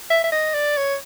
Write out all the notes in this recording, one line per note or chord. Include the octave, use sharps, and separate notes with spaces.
E5
E5
D#5
D5
C#5